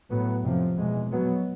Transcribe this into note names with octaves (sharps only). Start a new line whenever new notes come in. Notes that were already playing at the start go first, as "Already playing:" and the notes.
A2 F#3 B3
F2 C3 F3
E2 B2 G#3
B2 F#3 B3